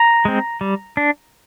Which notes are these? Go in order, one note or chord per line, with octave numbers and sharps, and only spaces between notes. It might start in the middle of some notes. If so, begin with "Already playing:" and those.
Already playing: A#5
G#3 C4
G3
D4